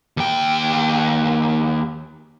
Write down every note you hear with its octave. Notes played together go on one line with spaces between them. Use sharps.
D#2 G5